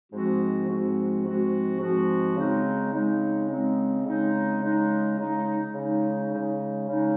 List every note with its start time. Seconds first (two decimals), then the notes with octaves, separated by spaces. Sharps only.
0.11 G#2 F3 G#3 C4 F#4
0.68 G#2 F3 G#3 C4 F#4
1.24 G#2 F3 G#3 C4 F#4
1.80 G#2 F3 G#3 C4 F#4
2.36 C#3 G#3 C4 D#4
2.93 C#3 G#3 C4 D#4
3.49 C#3 G#3 C4 D#4
4.05 C#3 G#3 C4 D#4
4.62 C#3 G#3 D#4
5.18 C#3 G#3 D#4
5.75 C#3 G#3 D#4
6.31 C#3 G#3 D#4
6.88 C#3 G#3 D#4